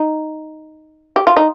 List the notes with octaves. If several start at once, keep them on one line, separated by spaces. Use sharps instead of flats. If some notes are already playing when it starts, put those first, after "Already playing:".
Already playing: D#4
G4
F4
D#4